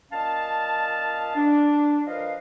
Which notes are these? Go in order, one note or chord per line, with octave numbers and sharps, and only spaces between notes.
A#2 C#4 D#5 F5 A5
D4
F3 A#4 B4 D#5 F5